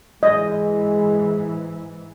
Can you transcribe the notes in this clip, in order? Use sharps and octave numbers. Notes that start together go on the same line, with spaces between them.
G#2 E3 G#3 D#5